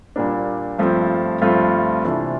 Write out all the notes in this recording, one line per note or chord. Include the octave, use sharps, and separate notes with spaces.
A#2 G3 A#3 D4
G2 F3 A3 C4 F4
G2 F3 A3 C4 F4
C3 E3 A3 D4 F4